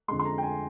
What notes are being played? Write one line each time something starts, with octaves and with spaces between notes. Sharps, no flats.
F2 D3 G#3 C6
C6
A#5
G5
G#5